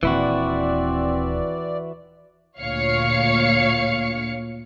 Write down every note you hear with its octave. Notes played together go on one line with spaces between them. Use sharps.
D#1 E3 C4 E4 F#4 D5
D2 A#2 C#5 F5 C#7